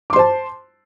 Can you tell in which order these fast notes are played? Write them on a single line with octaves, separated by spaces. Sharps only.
D6 C6 C5 A5